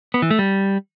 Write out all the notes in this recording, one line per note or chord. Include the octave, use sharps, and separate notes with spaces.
B3
E3
A3
G3